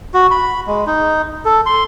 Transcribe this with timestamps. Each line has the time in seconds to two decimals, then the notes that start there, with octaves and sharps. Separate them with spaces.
0.14 F#4
0.31 B5
0.67 G#3
0.87 D#4
1.45 A4
1.66 C6